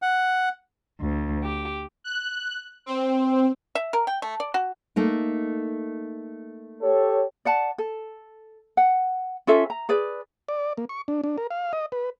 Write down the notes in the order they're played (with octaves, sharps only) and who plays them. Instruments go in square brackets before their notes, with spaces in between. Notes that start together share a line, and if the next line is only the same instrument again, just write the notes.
[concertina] F#5
[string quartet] D2
G4
[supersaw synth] F#6
C4
[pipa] E5
A#4
G5
A3
D5
F#4
[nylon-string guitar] A3 A#3 D#4
[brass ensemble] G4 A4 C#5
[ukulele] D5 F#5 A5
A4
F#5
C#4 F4 A4 E5
A#5
G#4 B4 D5
[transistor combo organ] D5
A#3
C#6
D4
D4
A#4
F5
D#5
B4